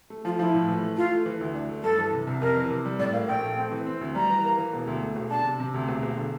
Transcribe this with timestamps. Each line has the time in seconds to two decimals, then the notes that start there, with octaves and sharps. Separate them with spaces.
0.10 A3
0.25 F3 F4
0.39 F3 E4
0.54 A2
0.68 E3
0.83 A3
0.96 A3 F4
1.12 A3
1.26 E3
1.41 D2
1.55 D4
1.69 A3
1.83 G2 A4
1.98 E3
2.13 C3
2.27 C2
2.42 F2 A#4
2.56 E3
2.71 C3
2.85 G3
2.99 A2 D5
3.13 A#3 F5
3.28 A#1 G5
3.43 A3
3.57 C4
3.72 E3
3.86 C4
4.01 D2
4.15 G3 A#5
4.30 E3
4.44 A#3
4.58 E3
4.73 E1
4.87 D2
5.02 A3
5.16 E1
5.30 D4 A5
5.45 C3
5.60 C3
5.74 D2
5.88 E1
6.03 E1
6.17 D3